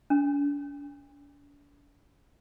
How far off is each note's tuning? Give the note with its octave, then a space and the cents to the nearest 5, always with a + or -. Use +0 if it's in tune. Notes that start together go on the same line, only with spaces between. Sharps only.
D4 -45